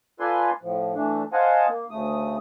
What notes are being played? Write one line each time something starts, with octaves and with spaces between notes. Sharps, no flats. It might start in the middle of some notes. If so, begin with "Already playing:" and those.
F4 A4 B4 D5 G#5 C6
A2 F3
E3 A3 D4
C5 D#5 F5 F#5 G#5 A5
A#3
D2 C#3 A3 D#6